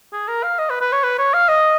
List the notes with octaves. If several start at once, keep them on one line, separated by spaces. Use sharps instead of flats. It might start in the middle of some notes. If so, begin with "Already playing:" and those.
G#4
A#4
F5
D#5
B4
B4
C#5
B4
C#5
F5
D#5